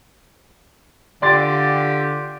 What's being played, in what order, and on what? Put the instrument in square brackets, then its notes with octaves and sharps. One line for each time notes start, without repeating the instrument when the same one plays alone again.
[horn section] D3 F4 G4 [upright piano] D5 C6 A6